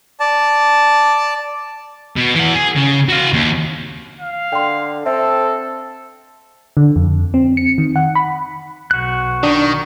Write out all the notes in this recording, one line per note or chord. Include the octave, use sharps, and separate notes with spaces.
D5 A5
B2
E3 F#5
G#4
C#3
F#4 F5
D#2
F5
D3 G5 C6
C4 A4 E5
D3
F2
C4
C#7
D#3
F#5
B5
B1 F#4 F#6
D#3 D4